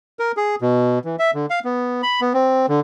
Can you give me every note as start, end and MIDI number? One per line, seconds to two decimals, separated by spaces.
0.19 0.32 70
0.37 0.55 68
0.61 0.99 47
1.05 1.16 52
1.19 1.31 76
1.34 1.46 50
1.50 1.60 77
1.64 2.02 59
2.03 2.21 83
2.21 2.33 59
2.34 2.66 60
2.68 2.80 50